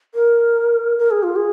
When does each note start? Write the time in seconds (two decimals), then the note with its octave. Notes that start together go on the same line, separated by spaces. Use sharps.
0.15 A#4
0.98 A#4
1.11 G#4
1.23 F4
1.36 G#4